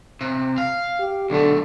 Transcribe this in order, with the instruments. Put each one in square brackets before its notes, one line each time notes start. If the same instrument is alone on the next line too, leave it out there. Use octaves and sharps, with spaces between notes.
[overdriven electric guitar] C3
F5
[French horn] G4
[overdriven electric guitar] B1 A3 [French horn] D3